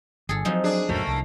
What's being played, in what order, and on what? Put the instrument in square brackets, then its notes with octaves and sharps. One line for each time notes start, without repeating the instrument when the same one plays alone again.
[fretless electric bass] G1 [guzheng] G#4 A4
[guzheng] F3 D#4 [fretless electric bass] F#3 A#3 C4
[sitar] D4 G#4
[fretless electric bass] D#1 F#2 F#3 [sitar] A3 A#3
[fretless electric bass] C2